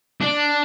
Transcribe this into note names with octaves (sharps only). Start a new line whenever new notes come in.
D4